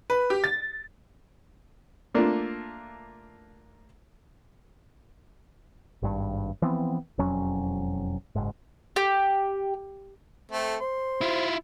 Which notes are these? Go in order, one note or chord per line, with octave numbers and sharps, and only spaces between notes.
B4
G4
A6
A3 A#3 D4 F4
G#1 G2
E3 F3 B3 C4
E1 F2 F#3 C#4
F#1 G#2
G4
A3 C4 A4
C5 C6
E4 F4